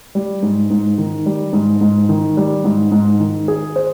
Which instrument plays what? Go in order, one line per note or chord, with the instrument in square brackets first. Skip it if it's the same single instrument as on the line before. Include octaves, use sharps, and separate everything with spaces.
[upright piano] G3
G#2
G#2
D#3
G3
G#2
G#2
D#3
G3
G#2
G#2
D#3
G#4
C5